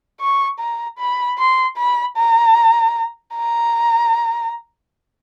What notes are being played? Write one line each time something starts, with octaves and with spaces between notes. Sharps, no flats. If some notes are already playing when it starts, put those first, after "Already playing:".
C#6
A#5
B5
C6
B5
A#5
A#5